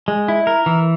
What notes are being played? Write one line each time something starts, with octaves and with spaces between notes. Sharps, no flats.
G#3
E4
A#4
E3